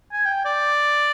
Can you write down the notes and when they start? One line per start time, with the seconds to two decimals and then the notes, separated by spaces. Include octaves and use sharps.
0.12 G#5
0.25 G5
0.45 D5